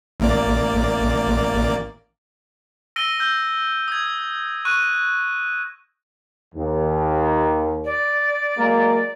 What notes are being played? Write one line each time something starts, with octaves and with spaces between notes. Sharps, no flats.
A1 A#3 D5
E6 A#6 D7 D#7 G7
E6 G6 A#6 G7
D#6 G#6
C#6 F#6 D#7
D#2
D5
F#3 G#3 A#3